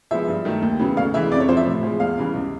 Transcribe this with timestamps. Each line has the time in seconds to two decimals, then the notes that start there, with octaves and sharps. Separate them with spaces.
0.11 F3 G#3 B3 E5
0.28 G2
0.45 D#3 F#3 A3
0.62 D#2
0.80 C#3 F#3 B3
0.97 D2 F5
1.14 C#3 E3 G#3 E5
1.31 F2 D5
1.40 C#5
1.49 C3 F3 C5
1.57 E5
1.66 A2
1.83 F3 G#3
2.00 E2 F5
2.17 C#3 E3 G3
2.34 C#2